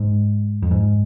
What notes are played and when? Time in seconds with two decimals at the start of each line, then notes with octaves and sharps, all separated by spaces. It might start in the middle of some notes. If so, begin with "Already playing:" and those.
Already playing: G#2
0.62 F2
0.71 G#2